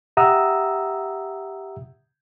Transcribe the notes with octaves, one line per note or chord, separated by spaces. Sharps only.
G4 E5 F#5 A#5 D#6 E6